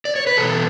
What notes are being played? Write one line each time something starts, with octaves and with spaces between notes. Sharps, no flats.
D5
C#5
B4
E2 B2 A4